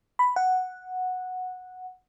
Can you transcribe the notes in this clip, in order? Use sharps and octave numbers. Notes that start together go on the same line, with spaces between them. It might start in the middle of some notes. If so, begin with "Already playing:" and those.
B5
F#5